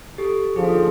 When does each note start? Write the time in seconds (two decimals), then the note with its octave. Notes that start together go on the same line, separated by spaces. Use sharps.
0.18 G4 A4
0.56 D#2 D3 F3 G#4
0.64 A4
0.73 G#4